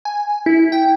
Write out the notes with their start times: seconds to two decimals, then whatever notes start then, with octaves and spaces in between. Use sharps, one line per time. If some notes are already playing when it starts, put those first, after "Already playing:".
0.05 G#5
0.46 E4
0.72 G5